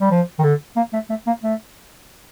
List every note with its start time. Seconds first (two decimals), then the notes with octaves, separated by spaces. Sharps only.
0.01 G3
0.11 F3
0.39 D#3
0.44 D3
0.77 A#3
0.93 A3
1.10 A3
1.27 A#3
1.44 A3